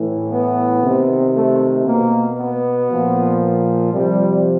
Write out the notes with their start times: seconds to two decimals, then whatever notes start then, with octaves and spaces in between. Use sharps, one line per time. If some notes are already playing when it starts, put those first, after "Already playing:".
Already playing: A2 E3
0.32 B3
0.83 C3 D#3
1.35 A3
1.86 B2 A#3
2.38 B3
2.90 A#2 F3
3.93 C3 F3 G3